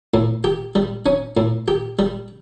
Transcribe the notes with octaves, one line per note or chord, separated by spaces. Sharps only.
A2
G4
G3
C#4
A2
G4
G3